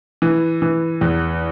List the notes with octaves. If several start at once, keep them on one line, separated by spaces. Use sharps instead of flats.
E3
E3
E2